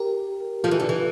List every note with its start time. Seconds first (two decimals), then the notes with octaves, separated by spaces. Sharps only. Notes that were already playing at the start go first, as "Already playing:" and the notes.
Already playing: G4 A#4
0.64 F3 F4 A4
0.71 E3
0.80 D3
0.89 E3